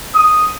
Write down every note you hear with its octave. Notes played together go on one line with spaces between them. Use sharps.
D#6